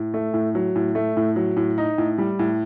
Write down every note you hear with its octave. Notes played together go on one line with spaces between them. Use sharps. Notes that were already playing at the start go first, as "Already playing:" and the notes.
Already playing: A2
A3
A2
F#3
A2
A3
A2
F#3
A2
D#4
A2
G3
A2